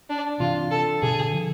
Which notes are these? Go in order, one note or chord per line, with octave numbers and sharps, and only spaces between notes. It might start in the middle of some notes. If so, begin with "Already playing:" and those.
D4
C3 E3 F4
A4
B2 D3 G#4
D3 F3